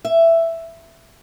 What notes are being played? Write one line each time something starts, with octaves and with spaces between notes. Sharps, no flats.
E5